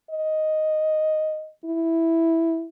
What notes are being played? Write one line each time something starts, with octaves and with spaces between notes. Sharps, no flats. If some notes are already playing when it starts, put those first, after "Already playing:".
D#5
E4